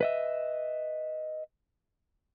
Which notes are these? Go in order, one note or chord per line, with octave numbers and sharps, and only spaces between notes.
B4 D#5 E5